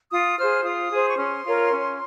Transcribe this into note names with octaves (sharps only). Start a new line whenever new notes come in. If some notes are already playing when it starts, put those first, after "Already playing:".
F4 D#6
G#4 C5 F6
F4 D#6
G#4 C5
C#6
C#4 C6
F4 A#4 C#5
C#4